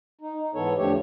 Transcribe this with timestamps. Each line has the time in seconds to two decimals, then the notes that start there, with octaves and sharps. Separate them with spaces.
0.21 D#4
0.41 D#4
0.55 G#2 E3 B3 A4 C#5
0.77 E2 D3 F3 A3 G4 C#5